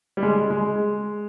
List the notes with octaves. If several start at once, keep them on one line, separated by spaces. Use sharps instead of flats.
G3
G#3
G#3